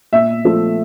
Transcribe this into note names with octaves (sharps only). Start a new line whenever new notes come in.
A#2 E5
F3 A3